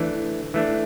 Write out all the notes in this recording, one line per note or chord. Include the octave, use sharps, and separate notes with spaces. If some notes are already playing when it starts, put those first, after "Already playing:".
Already playing: E3 A3 D4
E3 A3 D4